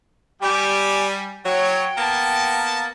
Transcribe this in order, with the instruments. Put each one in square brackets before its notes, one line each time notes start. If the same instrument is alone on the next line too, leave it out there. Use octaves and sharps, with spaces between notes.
[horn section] G3 [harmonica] G4 G#5
[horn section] F#3 C#5 [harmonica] G5
[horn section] A#3 B3 A5